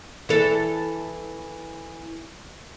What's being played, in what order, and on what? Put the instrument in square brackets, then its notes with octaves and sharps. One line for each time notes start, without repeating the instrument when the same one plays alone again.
[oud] E3 A4